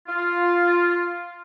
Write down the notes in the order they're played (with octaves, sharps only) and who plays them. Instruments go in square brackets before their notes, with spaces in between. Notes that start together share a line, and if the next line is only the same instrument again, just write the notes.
[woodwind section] F4